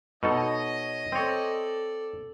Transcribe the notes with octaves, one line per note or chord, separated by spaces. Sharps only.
B2 D#4 A4 C#5 D#5
C4 A4 C#5 D5